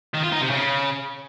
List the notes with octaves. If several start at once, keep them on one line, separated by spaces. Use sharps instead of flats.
D#3
F4
D#4
C3
C#3